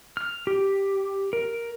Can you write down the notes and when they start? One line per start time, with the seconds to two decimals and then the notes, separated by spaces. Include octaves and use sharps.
0.17 F6
0.47 G4
1.33 A#4